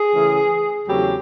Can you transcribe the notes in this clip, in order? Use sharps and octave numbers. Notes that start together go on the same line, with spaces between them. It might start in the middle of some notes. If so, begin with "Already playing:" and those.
Already playing: G#4
C#3 E3 A3 C#4
E2 C#3 F#3 A3 C4 G4